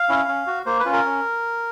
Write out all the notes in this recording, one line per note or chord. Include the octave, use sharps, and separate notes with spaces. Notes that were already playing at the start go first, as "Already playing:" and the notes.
Already playing: F5
C#4 E4
C#4
F#4
A#3 C5
B4
C#4 F4
A#4
C#4